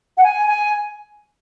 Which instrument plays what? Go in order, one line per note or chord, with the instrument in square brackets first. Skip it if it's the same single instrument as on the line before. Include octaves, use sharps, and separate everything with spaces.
[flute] F#5
G#5
G#5